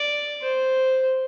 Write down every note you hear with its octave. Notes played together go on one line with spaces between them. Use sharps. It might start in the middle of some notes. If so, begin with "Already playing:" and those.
Already playing: D5
C5